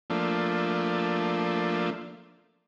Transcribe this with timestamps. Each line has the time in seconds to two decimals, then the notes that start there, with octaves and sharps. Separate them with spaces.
0.10 F3 A3 A#3 D4